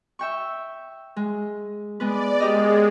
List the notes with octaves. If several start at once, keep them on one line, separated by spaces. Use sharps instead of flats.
E5 G5 C#6
G#3
G#3 B3 B4 D5
G#3 G4 A#4 D#5